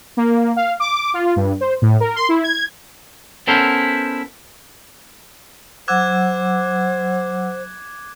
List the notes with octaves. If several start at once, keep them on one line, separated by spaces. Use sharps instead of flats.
A#3
F5
D6
F4
G2
C5
A2
A#4
C6
E4
G#6
B3 C#4 E4 A4 A#4 C5
F#3 C5 F#5 D6 E6 F#6 G#6